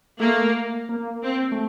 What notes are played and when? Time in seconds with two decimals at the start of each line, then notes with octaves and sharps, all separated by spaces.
0.20 A3 A#3
0.89 A#3
1.24 C4
1.52 A3